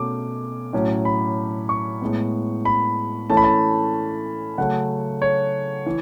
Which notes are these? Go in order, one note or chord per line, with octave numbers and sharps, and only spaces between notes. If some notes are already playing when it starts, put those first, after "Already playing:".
Already playing: B2 A3 C#4 D6
A2 F#3 C#4
B5
C#6
A2 G#3 B3
B5
E3 A3 C#4 A5
B5
A5
C#3 F#3 A3 C#4 F#5
C#5
E3